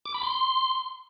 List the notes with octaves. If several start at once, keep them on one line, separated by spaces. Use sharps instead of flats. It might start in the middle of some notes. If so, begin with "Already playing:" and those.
D6
B5
C6